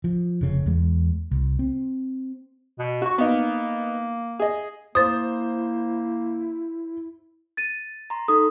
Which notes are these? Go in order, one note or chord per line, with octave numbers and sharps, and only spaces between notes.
F3
F1 C#3
E2 G#3
C2
C4
B2
F#4 C#6
A#3 B3 D#4
G#4 D#5
A#3 E4 C5 D#6 A6
A6 D#7
A#5 C6
D#4 A4 D#6